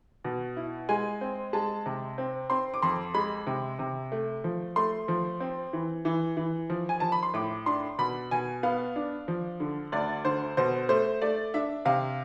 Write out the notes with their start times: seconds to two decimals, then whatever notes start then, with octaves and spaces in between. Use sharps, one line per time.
0.25 B2
0.57 E4
0.89 G#3 G#5
1.21 C4
1.53 G#3 A5
1.86 C3
2.18 C4
2.50 C4 C6
2.74 D6
2.82 F2 C6
3.14 G#3 B5
3.47 C3
3.79 C3
4.12 A3
4.44 F3
4.76 A3 C6
5.08 F3
5.40 C4
5.73 E3
6.05 E3
6.37 E3
6.70 F3
6.89 G#5
7.00 F3 A5
7.12 B5
7.23 C6
7.34 A2 D6
7.66 D4 C6
7.98 B2 B5
8.31 B2 G#5
8.63 B3 F5
8.96 D4
9.28 F3
9.60 D3
9.92 D2 D5
10.25 D3 C5
10.57 B2 C5
10.89 A3 C5
11.22 A3 D5
11.54 D4 E5
11.85 C3 F5